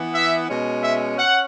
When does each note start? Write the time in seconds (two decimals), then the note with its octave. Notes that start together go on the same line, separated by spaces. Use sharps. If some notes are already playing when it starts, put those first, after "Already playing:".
Already playing: E3 B3
0.14 E5
0.48 B2 G#3 C#4
0.82 E5
1.16 C#4 F#5